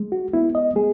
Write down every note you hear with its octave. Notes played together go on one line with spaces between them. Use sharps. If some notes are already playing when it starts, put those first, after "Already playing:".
Already playing: G#3
F#4
B3 E4
D#5
G#3 G#4